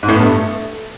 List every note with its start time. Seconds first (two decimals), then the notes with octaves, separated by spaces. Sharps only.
0.03 G#2
0.08 A2
0.14 B3
0.20 G2
0.26 A3